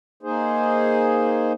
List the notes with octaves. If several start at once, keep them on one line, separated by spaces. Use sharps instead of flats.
A#3 D#4 G#4 C5